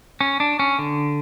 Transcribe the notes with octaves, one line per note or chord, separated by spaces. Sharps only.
C#4
D4
C#4
D3